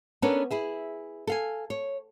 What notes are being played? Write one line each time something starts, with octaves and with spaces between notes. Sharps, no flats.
B3 C#4 D4 A4 A#4 C#5
E4 G#4 E5
A4 F5 G#5
C#5